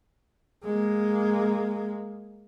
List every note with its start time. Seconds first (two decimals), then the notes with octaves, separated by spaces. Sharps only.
0.64 G#3 A#3